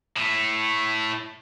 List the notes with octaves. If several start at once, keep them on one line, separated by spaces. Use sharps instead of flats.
A2 A3